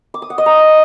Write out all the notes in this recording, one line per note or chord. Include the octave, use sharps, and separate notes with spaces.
D6
D#6
F#5
D#5
A#5